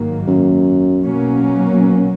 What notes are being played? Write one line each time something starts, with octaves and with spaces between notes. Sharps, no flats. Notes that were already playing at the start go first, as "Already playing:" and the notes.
Already playing: G#2 D#3 F#3 A#3
F#2
B2 F#3 A#3 C#4